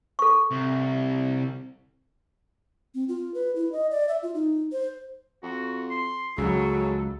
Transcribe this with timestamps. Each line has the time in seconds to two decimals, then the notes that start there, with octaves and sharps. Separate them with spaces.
0.19 A4 C#6
0.51 C2
2.95 C4
3.08 F4
3.34 B4
3.56 E4
3.72 D#5
3.91 D5
4.08 E5
4.23 F4
4.34 D#4
4.72 C5
5.43 F2 F#4
5.91 C6
6.38 C#2 C#3 F#3 A4